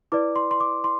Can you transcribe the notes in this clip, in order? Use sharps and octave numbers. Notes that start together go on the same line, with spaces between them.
E4 B4 D5 D6
C6
C6
D6
C6